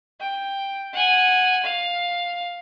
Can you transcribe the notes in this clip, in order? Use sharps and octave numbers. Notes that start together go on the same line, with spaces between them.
G5
F#5 G#5
F5